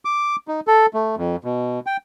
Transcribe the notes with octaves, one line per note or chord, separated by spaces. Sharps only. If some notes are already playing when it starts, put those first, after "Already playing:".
D6
D#4
A4
A3
F2
B2
G5